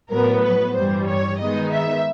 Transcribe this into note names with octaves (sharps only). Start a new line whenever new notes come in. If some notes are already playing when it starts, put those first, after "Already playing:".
A2 F#3 B3 A#4
B4
G2 E3 G3 C5
C#5
D#3 G#3 B3 D#4 D#5
E5